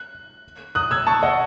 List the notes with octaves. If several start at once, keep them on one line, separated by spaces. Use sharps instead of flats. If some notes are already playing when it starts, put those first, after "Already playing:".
Already playing: F#6
D#6 F#6
E6 G#6
A5 C#6
D#5 F#5